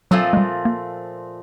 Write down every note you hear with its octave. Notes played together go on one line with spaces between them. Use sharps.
A#2 F3 F#3 A3 C4 F4
G#3
G3
A#3